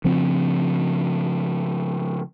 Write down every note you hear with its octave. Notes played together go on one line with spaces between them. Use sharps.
C#3 F3 C4